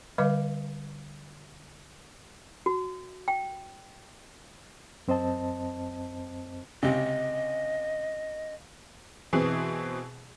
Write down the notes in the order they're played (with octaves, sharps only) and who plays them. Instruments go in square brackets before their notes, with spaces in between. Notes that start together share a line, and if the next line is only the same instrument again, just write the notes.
[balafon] D3 G3 B4 D#5 F5 D6
[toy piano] F#4
G5
[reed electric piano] F#2 C4 C5 D#5 A5
[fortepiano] C#2 C3 [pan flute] D#5
[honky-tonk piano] B2 E3 C4 G#4